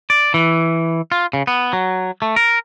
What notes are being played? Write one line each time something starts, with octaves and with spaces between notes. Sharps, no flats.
D5
E3
F4
C#3
B3
F#3
A3
A#4